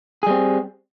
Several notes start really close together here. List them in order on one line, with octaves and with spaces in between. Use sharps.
G#4 G3 C4